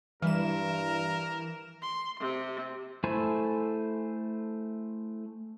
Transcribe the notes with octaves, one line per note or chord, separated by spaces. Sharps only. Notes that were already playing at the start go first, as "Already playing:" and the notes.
G2 E3 G3 A#4 E7
C6
C3
A3 E4 A4 C5 G#5